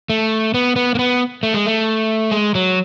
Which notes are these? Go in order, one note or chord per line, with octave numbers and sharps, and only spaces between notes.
A3
B3
B3
A#3
B3
A3
G#3
A3
G#3
F#3